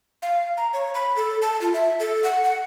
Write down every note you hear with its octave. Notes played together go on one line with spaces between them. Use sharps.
F5
A#5
C#5
B5
A4
A5
F4
E5
A4
F#5
F#5